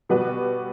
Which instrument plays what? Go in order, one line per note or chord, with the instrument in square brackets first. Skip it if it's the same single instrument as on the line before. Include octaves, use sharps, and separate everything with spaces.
[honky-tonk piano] B2 G3 B3 F#4 B4